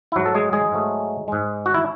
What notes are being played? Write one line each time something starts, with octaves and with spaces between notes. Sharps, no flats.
E4
G#2 F#3 A3 F#4
A4
G#3 G#4
G#3 G#4
G#2 F#3 A3
G#2 G#3
F#4
E4